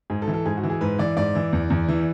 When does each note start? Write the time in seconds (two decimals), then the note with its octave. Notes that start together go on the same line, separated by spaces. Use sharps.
0.10 G#2 G#4
0.22 A4
0.28 E3
0.34 A4
0.46 G#2 G#4
0.57 F#4
0.63 E3
0.70 G#4
0.81 G#2 B4
0.99 E3 D5
1.17 G#2 D5
1.35 E3
1.53 E2
1.70 E2
1.88 E3